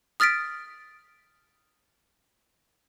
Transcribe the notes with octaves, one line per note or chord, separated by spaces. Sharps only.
D#6 F6 A6 B6 D7